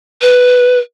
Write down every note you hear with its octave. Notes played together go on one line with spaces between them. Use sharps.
B4